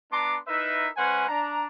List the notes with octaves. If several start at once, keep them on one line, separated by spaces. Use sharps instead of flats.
B3 D4 A5 A#5 C6 D6
D#4 E4 A#4 B4 E5
G#3 C#4 B4 C5 F#5 G#5
D4 A#5